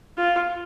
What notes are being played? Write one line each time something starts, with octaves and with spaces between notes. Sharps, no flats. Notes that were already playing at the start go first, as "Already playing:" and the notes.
F4